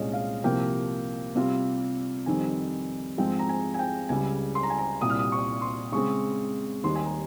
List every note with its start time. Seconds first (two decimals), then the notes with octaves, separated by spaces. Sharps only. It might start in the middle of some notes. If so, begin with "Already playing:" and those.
Already playing: C2 A#2 G#3 C#4 D#5
0.13 F5
0.44 C2 C3 F3 A#3 G5
1.35 C3 G3 C4 F4
2.26 F2 D#3 G3 C4 D#4 G#5
3.18 G#2 F3 G#3 C4 D#4 G5
3.39 A#5
3.49 G#5
3.74 G#5
3.79 G5
4.09 C#2 C#3 G3 G#5
4.55 C6
4.63 A#5
4.70 G#5
4.78 A#5
5.01 C2 A#2 G3 D#6
5.10 F6
5.19 D#6
5.32 C#6
5.62 C6
5.92 C#3 G#3 C4 C#6
6.83 D#2 D#3 G3 C6
6.96 G#5
7.05 A#5